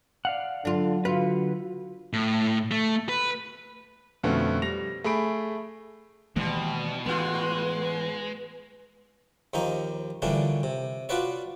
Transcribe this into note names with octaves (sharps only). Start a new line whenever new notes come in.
D5 F5 F#5
D3 F#3 D4 F4
D3 F4 F#4 B4
A2
A3
B4
F2 B2 D3 A3 B3 C#4
G3 A#6 F7
A3 G#4 B5 D7
B2 D#3 E3 G3 G#3 A#3
G#2 E3 G#3 B3 F4 F#4 B4
D#2 F3 D#4 G4 D#5 A#5
A#2 D3 E3 G3 C#4 D4
C3
D4 F4 F#4 B4 C#5 D5